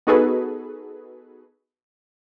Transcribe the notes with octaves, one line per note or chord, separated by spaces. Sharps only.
B3 D#4 F#4 G#4 A4 B4